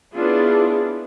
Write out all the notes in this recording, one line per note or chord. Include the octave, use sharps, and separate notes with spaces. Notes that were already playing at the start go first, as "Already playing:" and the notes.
B3 C#4 D4 E4 F4 G#4